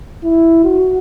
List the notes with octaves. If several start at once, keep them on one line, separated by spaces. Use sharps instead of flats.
E4
F#4